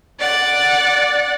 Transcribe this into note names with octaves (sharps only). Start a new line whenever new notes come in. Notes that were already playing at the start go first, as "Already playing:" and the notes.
D5 F#5